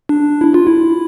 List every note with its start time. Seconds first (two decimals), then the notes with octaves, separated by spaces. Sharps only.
0.09 D4
0.41 E4
0.54 F4
0.67 E4